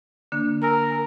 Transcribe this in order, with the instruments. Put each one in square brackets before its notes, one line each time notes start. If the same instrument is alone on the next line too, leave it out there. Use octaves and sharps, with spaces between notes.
[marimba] D3 A#3 D4
[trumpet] A#4 [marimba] G#5 E6